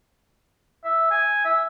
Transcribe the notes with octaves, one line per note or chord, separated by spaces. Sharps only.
E5
G#5
E5